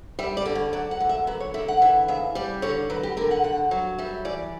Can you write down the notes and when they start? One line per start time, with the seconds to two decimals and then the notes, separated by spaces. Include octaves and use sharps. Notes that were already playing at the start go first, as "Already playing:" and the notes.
0.19 G3 E5
0.37 D5
0.46 D3
0.55 C#5
0.73 F#3 D5
0.91 F#5
1.00 D3
1.09 E5
1.27 F#3 B4
1.40 C#5
1.54 D3 E5
1.68 F#5
1.82 E3 E5
2.08 C#3 E5
2.35 G3 D5
2.62 D3 C#5
2.90 F#3 B4
3.03 G4
3.17 D3 A#4
3.31 F#5
3.44 G2 F#5
3.71 F#3
3.98 G3 E5
4.25 E3 D5